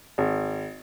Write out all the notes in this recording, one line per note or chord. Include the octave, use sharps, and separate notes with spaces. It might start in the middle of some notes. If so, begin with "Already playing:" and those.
G#1